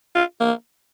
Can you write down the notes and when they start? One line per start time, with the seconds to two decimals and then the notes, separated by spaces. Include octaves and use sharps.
0.16 F4
0.41 A#3